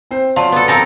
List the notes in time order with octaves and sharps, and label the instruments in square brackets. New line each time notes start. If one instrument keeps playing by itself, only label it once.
[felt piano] C4 C5
[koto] F#3 [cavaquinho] F4 [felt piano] D5 A5
[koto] B3 A4
[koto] F3 C4 A4 [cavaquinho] A#4 A5 A#5